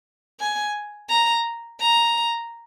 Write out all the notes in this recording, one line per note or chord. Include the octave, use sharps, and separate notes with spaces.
G#5
A#5
A#5